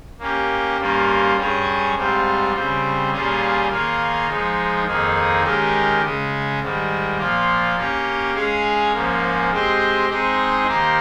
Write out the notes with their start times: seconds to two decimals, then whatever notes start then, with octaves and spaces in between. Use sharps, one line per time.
0.19 A#3 C#4 G4
0.78 G2 G3 A#3 C#4 F4
1.37 G2 G3 C#4 G#4 C#5
1.95 G#2 G3 C4 F4
2.52 C#3 G3 C4
3.11 A#2 G3 C#4 F4 G#4
3.69 D#3 A#3 F4 G#4 C#5
4.27 F3 G#3 D#4
4.85 F2 D#3 A#3 D#4 G#4
5.43 D#3 G#3 C#4 G4 A#4
6.01 C#3 G#3 C#4
6.60 G#2 D#3 G3
7.17 A#2 F3 A#3 F4
7.76 A#3 C#4 G4 C#5
8.35 G#3 C#4 G#4 C#5 F5
8.93 G#2 F3 A#3 C#4
9.51 G#3 C4 G4 C5 D#5
10.09 G#3 C4 D#4 G#4 D#5
10.67 D#3 A#3 D#4 G4 C5